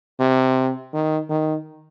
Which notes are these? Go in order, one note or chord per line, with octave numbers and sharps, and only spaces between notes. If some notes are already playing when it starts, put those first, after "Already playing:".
C3
D#3
D#3